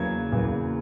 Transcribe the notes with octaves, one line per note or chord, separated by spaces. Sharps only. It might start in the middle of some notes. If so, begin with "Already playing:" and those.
Already playing: E2 C#3 F#3 A#3 G#6
E2 C#3 F#3 A#3